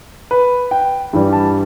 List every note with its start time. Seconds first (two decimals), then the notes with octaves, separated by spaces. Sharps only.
0.31 B4
0.71 G5
1.13 G2 E3 G3
1.33 A5